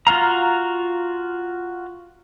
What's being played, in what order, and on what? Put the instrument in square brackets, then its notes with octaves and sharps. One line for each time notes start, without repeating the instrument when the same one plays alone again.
[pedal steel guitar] F4 F#4 F5 A#5